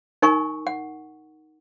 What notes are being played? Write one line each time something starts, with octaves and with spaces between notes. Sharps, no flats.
D#4 A#4 G#5 A#5 C#6
F#5